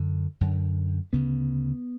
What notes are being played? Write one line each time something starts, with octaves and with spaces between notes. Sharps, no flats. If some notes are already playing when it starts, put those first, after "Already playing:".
Already playing: F#2 D3
F#2 D3
D2 C#3 B3